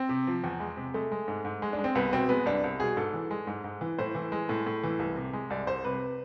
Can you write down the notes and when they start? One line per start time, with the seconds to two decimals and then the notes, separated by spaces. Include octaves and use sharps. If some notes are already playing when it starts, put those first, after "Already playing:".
Already playing: C4
0.09 C3
0.27 F3
0.44 E2
0.60 G#3
0.77 C3
0.94 G#3 A3
1.11 G#3
1.28 G#2
1.45 G#2
1.62 G#3
1.73 D4
1.79 G#3
1.84 C4
1.95 C2 B3
2.12 B2 C4
2.29 G#3 B3
2.46 C2 D4
2.64 C2
2.80 B2 G#4
2.97 G#2 A4
3.14 E3
3.31 G#3
3.47 G#2
3.64 G#2
3.81 E3
3.98 A2 C5
4.15 E3
4.32 G#3
4.49 A2
4.66 A2
4.83 E3
4.99 C2
5.16 C3
5.33 G#3
5.50 C2 D5
5.67 C2 C5
5.84 C3 B4